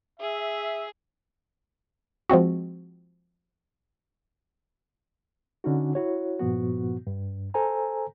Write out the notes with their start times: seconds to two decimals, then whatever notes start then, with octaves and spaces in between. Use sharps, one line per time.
0.20 G#4 E5
2.30 F3 G#3 C4 F#4
5.64 D3 C#4 D#4 F#4
5.95 E4 F#4 C#5
6.40 G2 A#2 F3 B3 F#4
7.07 G2
7.54 A4 C5 G#5 A#5